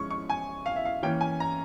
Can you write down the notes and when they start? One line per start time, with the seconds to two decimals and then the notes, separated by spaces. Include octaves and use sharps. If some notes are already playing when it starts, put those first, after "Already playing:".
Already playing: F3 G#3 C#4 C#6
0.11 C#6
0.30 G#5
0.66 F5
0.76 E5
0.85 F5
1.03 E3 A#3 C#4 G5
1.21 G#5
1.40 A#5